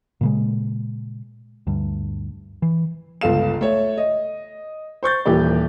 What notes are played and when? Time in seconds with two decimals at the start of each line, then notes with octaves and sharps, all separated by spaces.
0.21 A#2 C#3 G#3
1.67 D2 G2
2.62 E3
3.21 G1 C#2 A4 F5 E7
3.61 A3 C#5
3.98 D#5
5.03 C5 C#6 G6 A6
5.26 D#1 E3 A#3 G4 D5